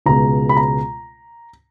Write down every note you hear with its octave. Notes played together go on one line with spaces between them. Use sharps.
C#2 B2 G#3 A#5
B5
A#5